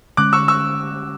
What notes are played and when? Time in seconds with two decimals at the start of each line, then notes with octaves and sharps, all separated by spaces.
0.17 D3 G#3 C#4 D6 F#6
0.33 C#6 E6
0.48 C#6 E6